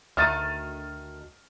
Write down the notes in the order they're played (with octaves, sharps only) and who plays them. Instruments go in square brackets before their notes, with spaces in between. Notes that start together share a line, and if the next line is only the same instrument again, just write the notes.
[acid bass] D2 [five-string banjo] D#3 A3 [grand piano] F6 A6 D#7